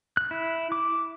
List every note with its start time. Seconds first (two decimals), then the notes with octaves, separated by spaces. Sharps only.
0.17 F#6
0.31 E4
0.72 D6